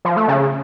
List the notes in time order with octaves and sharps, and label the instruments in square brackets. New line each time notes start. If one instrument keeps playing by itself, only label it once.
[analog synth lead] F3
A3
C#3